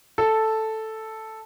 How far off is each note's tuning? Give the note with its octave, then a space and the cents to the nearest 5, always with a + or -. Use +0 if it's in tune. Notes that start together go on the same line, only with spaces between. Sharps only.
A4 +0